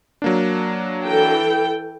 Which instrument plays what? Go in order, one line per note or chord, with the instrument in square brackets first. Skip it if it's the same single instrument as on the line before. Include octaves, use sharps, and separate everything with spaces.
[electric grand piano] F#3 A#3 D4
[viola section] E3 A4 G5